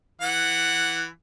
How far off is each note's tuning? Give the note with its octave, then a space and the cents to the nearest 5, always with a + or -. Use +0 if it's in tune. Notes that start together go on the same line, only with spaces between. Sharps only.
E3 +0 F#5 +0